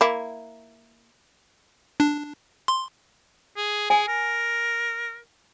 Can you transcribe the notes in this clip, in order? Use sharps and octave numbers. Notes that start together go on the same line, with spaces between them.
A#3 E4
D4
C6
G#4
G#4 G#5
A#4